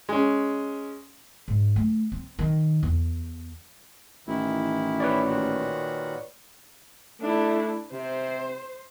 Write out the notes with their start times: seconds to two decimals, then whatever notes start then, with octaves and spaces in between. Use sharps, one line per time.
0.09 G#3 C#4
1.48 G#2
1.76 A3
2.12 C4
2.39 D#3
2.83 E2
4.28 A1 D#3 E3 E4
5.00 B4 C#5 D5
5.26 A#2 D#3 F#4
7.21 A3 D4 E4
7.93 C3 C5